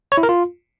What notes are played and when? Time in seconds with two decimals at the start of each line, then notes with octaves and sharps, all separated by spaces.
0.12 C#5
0.17 E4
0.23 A#4
0.29 F4